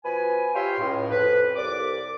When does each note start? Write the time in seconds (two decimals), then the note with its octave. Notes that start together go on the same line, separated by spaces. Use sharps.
0.04 B2 F3 B4 G#5
0.55 F4 G4 C#5 E5 G5 C6
0.80 C#2 A2
1.11 F2 B4
1.56 C2 D5 D6